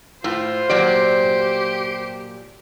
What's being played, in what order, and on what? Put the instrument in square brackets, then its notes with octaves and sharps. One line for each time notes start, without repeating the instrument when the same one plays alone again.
[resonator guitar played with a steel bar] A2 [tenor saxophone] F4 [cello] C5
[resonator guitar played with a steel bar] A#2 F#3 D5 [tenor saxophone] G4